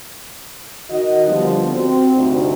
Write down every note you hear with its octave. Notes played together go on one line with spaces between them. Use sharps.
D#3 F#4 D#5
D3 F3 G3 B3
C4 F#4
D2 G2 C3 D#4